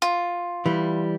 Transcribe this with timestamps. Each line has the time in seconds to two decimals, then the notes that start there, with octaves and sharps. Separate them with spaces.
0.02 F4
0.66 E3 G3